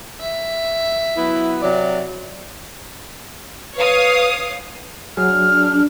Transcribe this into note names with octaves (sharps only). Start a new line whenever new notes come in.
E5
F#3 B3 E4
C3 F#3 D5
B4 C#5 F5 D#6
F#3 D4 G#4 F6